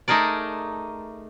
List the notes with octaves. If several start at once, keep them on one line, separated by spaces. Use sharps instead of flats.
A3 D#4 G#4 A#4 D5